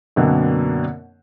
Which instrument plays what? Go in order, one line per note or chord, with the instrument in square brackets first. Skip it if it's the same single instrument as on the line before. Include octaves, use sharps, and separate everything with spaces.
[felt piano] F#2 B2 D3 A#3 C4 D4